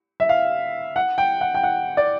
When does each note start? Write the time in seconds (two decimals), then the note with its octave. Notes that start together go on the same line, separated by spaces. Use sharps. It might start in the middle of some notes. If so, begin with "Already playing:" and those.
0.20 E5
0.29 F5
0.96 F#5
1.18 G5
1.41 F#5
1.55 G5
1.63 F#5
1.97 D5